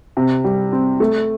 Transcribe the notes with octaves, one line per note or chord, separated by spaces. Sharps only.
C3
G3
C4
A3